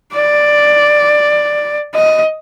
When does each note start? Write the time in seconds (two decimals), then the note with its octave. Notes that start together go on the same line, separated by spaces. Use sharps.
0.14 D5
1.94 D#5